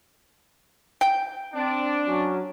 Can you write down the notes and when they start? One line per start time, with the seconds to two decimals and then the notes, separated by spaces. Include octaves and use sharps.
1.01 G5
1.54 C4 D4
2.07 F#3 C#4